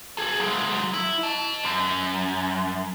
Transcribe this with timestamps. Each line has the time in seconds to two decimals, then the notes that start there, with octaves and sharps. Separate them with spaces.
0.17 G#4 A4
0.40 F#3 G#3
0.94 E4
1.23 D#5 A5
1.65 F#2